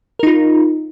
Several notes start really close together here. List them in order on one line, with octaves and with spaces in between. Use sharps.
A#4 D#4 F4